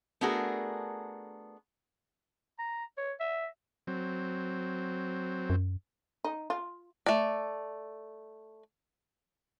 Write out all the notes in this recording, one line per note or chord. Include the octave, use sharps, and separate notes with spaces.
A3 B3 D4 F#4 G#4 A#4
A#5
C#5
E5
F#3 C4
F#2
D#4
F4
A3 D5